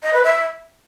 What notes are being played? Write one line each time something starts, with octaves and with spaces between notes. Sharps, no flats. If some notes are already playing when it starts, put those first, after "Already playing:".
D#5
B4
E5